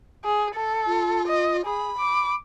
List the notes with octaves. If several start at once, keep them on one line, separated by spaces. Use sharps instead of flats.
G#4
A4
F4
D#5
G#4 B5
D6